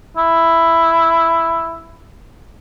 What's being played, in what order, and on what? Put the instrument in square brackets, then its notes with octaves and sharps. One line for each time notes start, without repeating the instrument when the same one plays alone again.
[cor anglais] E4